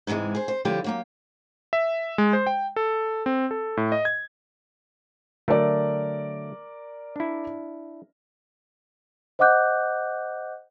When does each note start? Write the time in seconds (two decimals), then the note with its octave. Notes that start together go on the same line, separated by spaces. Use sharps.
0.07 G#2 C3 D#3 E3 G#3
0.35 G#4 C5
0.48 C5
0.65 D3 F3 G3 E4 G4 C#5
0.84 F#3 A#3 G4
1.73 E5
2.18 G#3
2.33 C5
2.47 G5
2.76 A4
3.26 C4
3.51 A4
3.77 A2
3.92 D#5
4.05 G#6
5.48 D3 F#3 A3 A#4 D5
7.16 D4 E4
9.39 C5 D#5 F#5 D6 F#6 G6